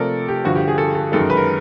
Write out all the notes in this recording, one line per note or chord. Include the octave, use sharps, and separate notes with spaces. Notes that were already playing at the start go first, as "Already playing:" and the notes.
Already playing: C3 F3 A3 A4 A#4 D5
G4
G2 D3 F3 F#4
G4
G#4
A4
A4
F#2 D#3 G#3 A4
A#4
B4
A#4